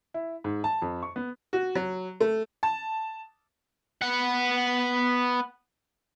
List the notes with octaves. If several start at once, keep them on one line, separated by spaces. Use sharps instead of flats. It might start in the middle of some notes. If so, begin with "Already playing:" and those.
E4
G#2
A5
F2
C#6
B3
F#4
F#3
A3
A5
B3 F#5